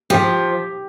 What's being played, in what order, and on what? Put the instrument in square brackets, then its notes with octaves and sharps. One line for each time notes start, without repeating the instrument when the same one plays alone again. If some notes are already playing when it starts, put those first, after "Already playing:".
[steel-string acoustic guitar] F3 [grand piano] G4